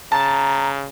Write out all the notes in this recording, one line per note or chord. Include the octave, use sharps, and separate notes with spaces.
C#3 A5 A#5